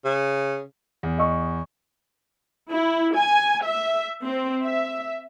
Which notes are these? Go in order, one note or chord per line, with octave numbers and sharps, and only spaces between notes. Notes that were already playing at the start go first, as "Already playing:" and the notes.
C#3
E2
D#5 C#6
E4
G#5
E5
C4
E5